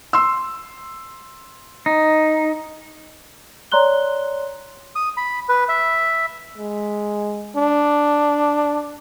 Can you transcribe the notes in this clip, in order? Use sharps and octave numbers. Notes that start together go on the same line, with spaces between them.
C6 E6
D#4
C#5 D5 A#5 C6 F#6 G7
D#6
B5
B4
E5
G#3
D4